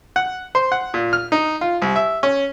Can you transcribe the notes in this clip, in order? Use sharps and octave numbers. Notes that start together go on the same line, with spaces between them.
F#5
C5
F#5
A#2
F6
D#4
F4
C2
E5
C#4